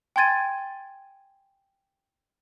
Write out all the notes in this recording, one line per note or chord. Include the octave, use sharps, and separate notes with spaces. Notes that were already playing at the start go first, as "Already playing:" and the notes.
G5 G#5 C6 G#6 A6 D#7